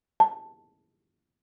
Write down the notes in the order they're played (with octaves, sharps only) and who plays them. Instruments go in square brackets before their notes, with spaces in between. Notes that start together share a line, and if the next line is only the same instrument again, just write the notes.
[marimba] A5